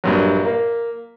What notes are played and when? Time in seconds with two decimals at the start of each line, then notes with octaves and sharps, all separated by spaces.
0.04 A#1 G2 F#3
0.45 A#3